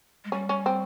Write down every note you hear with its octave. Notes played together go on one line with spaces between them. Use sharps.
G#3
G3 C#4
C#4
C4